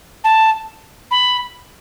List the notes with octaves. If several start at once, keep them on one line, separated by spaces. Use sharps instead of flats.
A5
B5